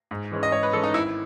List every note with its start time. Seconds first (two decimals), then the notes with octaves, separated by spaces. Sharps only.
0.11 G#2
0.32 E3 G#3 C#4
0.43 D#5
0.52 G#2 C#5
0.63 B4
0.73 E3 G#3 C#4 A4
0.83 D#4
0.94 G#1 E4